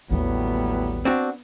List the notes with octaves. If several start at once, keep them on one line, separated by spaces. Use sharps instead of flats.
A1 D#2 A2 F#3 G3 B3
C4 D4 F#4